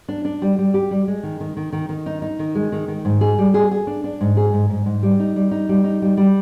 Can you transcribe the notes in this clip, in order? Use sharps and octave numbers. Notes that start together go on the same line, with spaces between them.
D4
D4
G3
G3
G4
G3
G#3
D#3
D#3
D#3
D#3
D#3
D#4
D#4
D#3
G#3
D#3
D#3
G#2
G#4
G3
G#4
G#4
D4
D4
G#2
G#4
G#2
G#2
G#2
G3
D#4
G3
D#4
G3
D#4
G3
G3